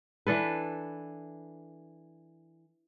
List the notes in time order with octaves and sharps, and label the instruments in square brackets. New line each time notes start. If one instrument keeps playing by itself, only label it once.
[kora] E3 D4 A4 B4